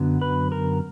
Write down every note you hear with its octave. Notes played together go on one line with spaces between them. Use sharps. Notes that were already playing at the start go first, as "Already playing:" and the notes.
Already playing: F#2 D3 F#3 B3
B4
A#4